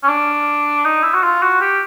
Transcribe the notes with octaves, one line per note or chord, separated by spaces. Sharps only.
C#4
D4
D#4
E4
F#4
F4
F#4
G4